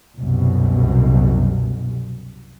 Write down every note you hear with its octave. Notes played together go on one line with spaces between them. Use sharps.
C2 F#2 B2